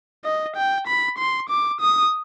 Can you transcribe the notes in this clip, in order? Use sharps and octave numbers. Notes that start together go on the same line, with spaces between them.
D#5
G5
B5
C6
D6
D#6